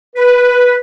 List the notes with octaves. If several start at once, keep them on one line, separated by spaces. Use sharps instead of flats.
B4